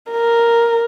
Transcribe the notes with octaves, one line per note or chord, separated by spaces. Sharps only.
A#4